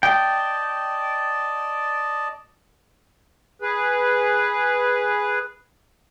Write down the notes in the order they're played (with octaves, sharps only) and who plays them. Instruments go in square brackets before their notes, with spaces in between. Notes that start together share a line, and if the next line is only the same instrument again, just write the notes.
[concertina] D5 D#5 A5 [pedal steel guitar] G5
[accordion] G#4 B4